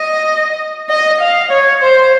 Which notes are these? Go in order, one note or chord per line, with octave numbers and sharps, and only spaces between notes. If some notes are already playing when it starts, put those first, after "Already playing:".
Already playing: D#5
D#5
F5
C#5
C5